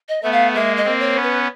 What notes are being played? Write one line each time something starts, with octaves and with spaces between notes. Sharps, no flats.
D#5
A3 B3 E5
F5
G#3 A#3 E5
D#5
A#3 C4
C#5
B3 C#4
B4